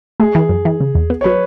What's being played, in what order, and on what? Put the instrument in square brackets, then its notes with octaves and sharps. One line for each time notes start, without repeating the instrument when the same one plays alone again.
[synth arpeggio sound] A3 [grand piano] G#4
[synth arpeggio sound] E3
F#2
E3
C#3
E2
B3
[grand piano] C#5
[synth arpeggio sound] F#3 [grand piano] B4